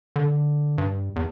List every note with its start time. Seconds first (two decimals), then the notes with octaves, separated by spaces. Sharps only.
0.16 D3
0.78 G2
1.16 E2